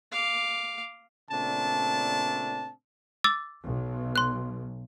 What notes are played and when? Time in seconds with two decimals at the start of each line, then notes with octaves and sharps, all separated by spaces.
0.12 F5 D6
1.31 A#2 C#3 A3 C4 D4 A5
3.24 D6 E6 A6
3.63 B1
4.16 C6 F#6